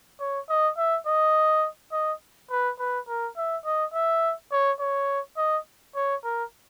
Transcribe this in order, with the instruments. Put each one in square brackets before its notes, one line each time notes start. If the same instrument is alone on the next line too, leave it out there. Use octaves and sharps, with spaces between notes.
[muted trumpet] C#5
D#5
E5
D#5
D#5
B4
B4
A#4
E5
D#5
E5
C#5
C#5
D#5
C#5
A#4